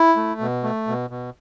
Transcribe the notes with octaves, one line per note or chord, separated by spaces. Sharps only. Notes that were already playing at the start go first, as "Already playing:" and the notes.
Already playing: E4
A3
B2
A3
B2
B2